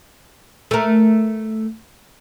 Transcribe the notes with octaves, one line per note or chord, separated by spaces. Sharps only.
A3 A#4